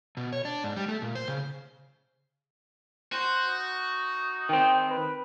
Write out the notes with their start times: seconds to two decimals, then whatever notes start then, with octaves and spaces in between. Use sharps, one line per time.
0.17 B2
0.33 C#5
0.45 D4
0.64 G#2
0.76 G3
0.88 A3
1.02 A#2
1.15 C5
1.28 C#3
3.12 F#4 C5
3.49 D#4
4.49 D#3 C4 G5
4.90 B4